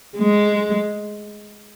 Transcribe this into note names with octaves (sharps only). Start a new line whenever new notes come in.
G#3